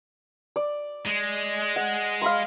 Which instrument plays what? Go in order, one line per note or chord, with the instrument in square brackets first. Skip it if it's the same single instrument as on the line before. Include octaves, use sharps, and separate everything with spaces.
[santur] D5
[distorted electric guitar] G#3
[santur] F#5
F5 B5 C6